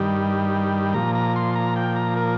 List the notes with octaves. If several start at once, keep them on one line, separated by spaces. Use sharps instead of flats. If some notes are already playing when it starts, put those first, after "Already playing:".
Already playing: G2 D#3 G3
A#2 F3 A#5
A#5
C6
A#5
G5
A#5
A#4